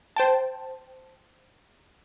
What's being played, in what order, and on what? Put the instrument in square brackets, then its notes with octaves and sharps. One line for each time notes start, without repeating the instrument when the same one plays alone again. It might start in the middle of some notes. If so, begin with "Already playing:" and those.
[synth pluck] C5 G5 A5